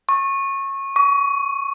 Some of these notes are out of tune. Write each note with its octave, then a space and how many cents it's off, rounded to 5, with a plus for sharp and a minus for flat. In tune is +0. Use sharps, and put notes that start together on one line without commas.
C#6 -20
C#6 +30